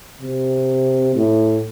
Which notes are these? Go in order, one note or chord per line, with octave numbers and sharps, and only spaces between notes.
C3
A2